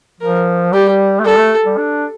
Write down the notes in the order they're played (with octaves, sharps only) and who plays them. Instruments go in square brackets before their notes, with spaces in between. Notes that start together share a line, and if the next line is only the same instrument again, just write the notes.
[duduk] F3 [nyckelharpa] A#4
[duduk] G3 [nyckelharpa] G4
[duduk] A3
[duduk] G3 [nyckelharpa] A4
[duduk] A3
G3
D4